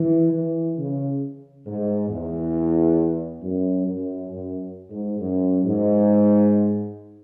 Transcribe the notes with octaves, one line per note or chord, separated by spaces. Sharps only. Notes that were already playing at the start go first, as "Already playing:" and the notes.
Already playing: E3
E3
C#3
G#2
E2
F#2
F#2
F#2
G#2
F#2
G#2